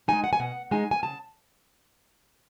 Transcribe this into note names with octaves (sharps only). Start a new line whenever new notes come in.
G#3 D#4 G#5
F#5
G#5
B2 F#5
G#3 D#4 G#5
G#5
C#3 A5